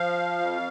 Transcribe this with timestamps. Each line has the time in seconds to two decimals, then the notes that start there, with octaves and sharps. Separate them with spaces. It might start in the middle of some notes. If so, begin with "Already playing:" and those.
Already playing: F3 F5
0.40 F2